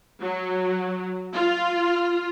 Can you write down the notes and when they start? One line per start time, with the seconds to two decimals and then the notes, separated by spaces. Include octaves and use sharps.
0.20 F#3
1.33 F4